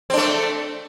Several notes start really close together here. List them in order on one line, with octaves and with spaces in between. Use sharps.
C4 D4 A3